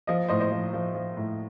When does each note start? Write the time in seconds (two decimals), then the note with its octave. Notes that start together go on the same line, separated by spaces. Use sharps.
0.07 F3 D#5
0.28 A2 C5 D#5
0.40 C5 D#5
0.52 F3
0.73 F3
0.94 F3
1.17 A2